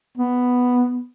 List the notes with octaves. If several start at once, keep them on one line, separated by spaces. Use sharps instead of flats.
B3